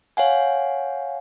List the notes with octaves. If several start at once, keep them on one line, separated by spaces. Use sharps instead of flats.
C#5 F5 F#5 G#5